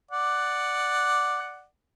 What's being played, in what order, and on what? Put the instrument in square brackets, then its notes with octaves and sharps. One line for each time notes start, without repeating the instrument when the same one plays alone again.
[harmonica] D5 F#5